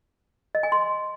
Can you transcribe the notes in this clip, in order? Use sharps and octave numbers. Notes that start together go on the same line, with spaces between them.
D#5
G#5
C6